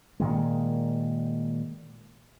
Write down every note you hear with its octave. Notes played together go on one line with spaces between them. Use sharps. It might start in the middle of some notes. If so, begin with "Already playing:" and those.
A#2 D#3 G#3